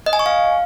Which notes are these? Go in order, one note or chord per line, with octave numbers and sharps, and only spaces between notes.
D#5
G#5
C#6
F5